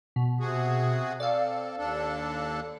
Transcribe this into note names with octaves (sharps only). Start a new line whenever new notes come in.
B2
C3 F#4 G#4
C4 A4 D5 F5
D#2 D4 A4